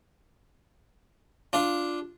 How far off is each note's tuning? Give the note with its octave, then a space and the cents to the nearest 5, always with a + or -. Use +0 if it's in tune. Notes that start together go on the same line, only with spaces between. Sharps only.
D4 +0 F4 +0